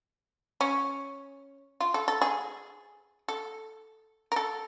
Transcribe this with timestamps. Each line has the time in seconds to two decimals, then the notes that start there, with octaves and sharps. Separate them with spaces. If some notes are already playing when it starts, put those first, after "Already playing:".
0.61 C#4
1.80 F4
1.94 A4
2.08 A4
2.21 G#4
3.28 A4
4.32 A#4
4.36 A4